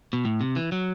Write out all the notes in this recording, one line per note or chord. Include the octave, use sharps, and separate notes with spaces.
B2
A2
C3
E3
F#3